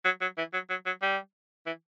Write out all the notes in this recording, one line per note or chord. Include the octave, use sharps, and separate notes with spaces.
F#3
F#3
E3
F#3
F#3
F#3
G3
E3